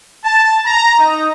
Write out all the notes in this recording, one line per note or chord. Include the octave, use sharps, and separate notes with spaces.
A5
A#5
D#4